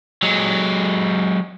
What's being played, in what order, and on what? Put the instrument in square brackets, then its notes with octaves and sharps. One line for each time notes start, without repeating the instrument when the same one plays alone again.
[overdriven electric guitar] F#3 G#3